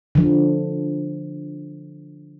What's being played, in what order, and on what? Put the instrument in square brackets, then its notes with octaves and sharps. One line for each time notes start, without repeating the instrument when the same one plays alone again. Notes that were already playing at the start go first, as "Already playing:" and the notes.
[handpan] D3 F3